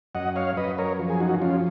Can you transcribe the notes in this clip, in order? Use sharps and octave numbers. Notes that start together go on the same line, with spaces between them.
F#2 D#5 F#5
C#5 F5
F#2 B4 D#5
A#4 C#5
F3
G#4
D#4 F#4
F3 C#4 F4